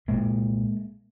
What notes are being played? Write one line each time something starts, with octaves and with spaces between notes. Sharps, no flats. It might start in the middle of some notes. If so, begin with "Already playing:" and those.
C2 A#2 G#3 A#3